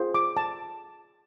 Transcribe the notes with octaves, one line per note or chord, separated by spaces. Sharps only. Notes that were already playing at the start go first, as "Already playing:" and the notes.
Already playing: F4 G#4 C5
D6
A5